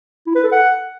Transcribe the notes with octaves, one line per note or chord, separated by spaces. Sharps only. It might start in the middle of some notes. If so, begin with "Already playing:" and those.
E4
B4
A4
F#5